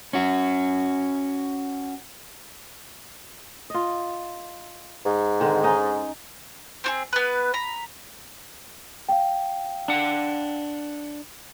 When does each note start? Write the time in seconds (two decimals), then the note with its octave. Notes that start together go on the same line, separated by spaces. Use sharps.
0.13 C#4 F#4
3.70 F4 D#5
5.05 G#2
5.40 D3 D#3 C4
5.63 C#4 D#4 D#5
6.84 C4 F#4 G#4
7.13 B3 B4
7.54 A#5 B5
9.09 F5 G5
9.88 D4 F#5